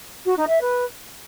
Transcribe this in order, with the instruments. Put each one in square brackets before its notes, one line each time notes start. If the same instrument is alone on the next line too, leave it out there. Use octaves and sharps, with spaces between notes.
[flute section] F#4
D#4
E5
B4